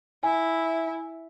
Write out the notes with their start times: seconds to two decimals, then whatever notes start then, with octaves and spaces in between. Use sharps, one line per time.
0.23 E4 G#5